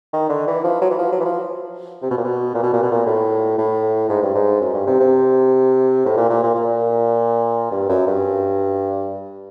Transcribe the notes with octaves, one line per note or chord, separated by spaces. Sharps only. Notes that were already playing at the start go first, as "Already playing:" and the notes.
D#3
D3
E3
F3
F#3
E3
F3
F#3
E3
F3
C3
B2
A#2
B2
A#2
B2
A#2
B2
A#2
A2
A2
G#2
G2
G#2
F#2
G2
C3
C3
A2
A#2
A#2
A#2
A#2
G2
F#2
G2